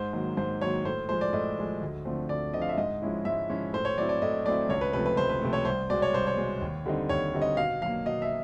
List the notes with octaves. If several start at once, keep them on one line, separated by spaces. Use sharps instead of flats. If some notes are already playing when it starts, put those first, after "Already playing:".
Already playing: G#2 C5
D#3 F#3 A#3
G#2 C5
D#3 F#3 A#3 C#5
A2 C5
F3 G#3 C5
D5
A2 D#5
F3 G#3
D2
D3 F3 A3 C4
D2 D5
D3 F3 A3 C4 D#5
F5
E5
G#2 D#5
F3 G#3 C#4 E4
G#2 E5
F3 G#3 C#4 E4
A2 C5
C#5
F#3 A3 C4 E4 D5
D5
A2 D#5
F#3 A3 C4 E4 D5
C#2 C#5
B4
C3 F3 A3 B4
B4
C#2 C5
B4
C3 F3 A3
C#5
C2 C5
B2 G#3 D5
C#5
C2 C5
C#5
B2 G#3
D#2
D3 G3 C4 D#4
D#2 C#5
D3 G3 C4 D#4
D#5
B2 F5
F#3 A#3 F5
B2 D#5
E5